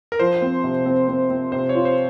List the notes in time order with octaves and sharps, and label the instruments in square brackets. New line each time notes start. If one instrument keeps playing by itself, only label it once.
[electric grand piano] A#4
[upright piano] F3 [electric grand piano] C5
[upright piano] C4
C3
C4
C4
C4
[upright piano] C3 [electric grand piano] C5
[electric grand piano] C#5
[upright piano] F4
[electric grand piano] C5